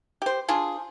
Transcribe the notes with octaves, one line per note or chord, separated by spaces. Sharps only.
G4 C5
D4 F4 G#4